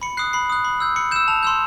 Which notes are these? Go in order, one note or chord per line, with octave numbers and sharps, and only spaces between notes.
B5 C#7
D#6 F#6 C7
B5 C7
D#6 F#6
B5
E6 G6
B5 C#7
E6 G6 E7
A5 F7
C6 E6 G6